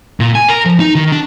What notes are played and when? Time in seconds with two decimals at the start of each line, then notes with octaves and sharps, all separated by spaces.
0.20 A#2
0.35 G#5
0.49 A#4
0.66 F3
0.80 D#4
0.95 D#3
1.12 D4